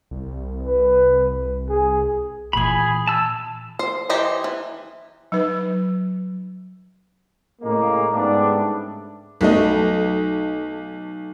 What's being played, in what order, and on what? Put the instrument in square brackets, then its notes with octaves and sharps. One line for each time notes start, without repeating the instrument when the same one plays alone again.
[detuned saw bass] C2
[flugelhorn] B4
G#4
[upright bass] A#2 E3 [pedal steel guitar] G#4 B5
[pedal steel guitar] A5 E6
[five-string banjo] C5
E3 G4 C5 D#5 A#5
E3
[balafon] F#3 D#4 B4
[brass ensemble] A2 C#3 G#3 A#3
G#2 C#3 G3 A3 B3 D4
[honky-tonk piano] B1 A3 D#5